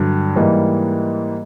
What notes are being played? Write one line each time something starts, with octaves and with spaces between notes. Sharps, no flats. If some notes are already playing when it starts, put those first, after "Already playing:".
Already playing: G2 D3 F#3
G#2 E3 G3 A#3